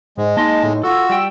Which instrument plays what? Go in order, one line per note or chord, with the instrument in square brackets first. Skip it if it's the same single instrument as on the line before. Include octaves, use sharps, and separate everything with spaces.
[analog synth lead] G#2 [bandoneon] G#3
[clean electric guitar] A#3 D#5 C6 [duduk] D#4 [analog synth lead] A5
[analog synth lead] A2
[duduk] F4 [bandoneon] F#4 [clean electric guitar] A4 [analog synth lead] E6
[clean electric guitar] G3 G5